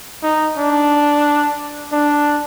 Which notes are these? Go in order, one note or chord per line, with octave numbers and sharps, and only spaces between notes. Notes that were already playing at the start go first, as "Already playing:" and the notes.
D#4
D4
D4